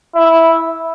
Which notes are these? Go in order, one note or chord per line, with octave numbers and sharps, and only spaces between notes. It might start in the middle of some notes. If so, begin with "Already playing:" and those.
E4